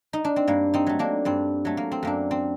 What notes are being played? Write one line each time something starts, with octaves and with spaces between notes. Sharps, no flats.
D#4
D4
C4
G2 A#3
C4 D#4
F#3 A3
A#3 D4
G2 C4
F#3 A3
A#3
C4
F#2 A#3 D4
C4